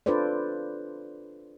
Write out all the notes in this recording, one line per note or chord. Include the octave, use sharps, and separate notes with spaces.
D4 F4 A4 B4 C5 D5